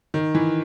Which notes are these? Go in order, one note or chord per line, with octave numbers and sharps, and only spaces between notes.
D#3
E3